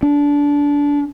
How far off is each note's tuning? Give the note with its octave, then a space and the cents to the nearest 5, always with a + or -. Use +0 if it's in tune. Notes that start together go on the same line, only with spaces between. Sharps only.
D4 -25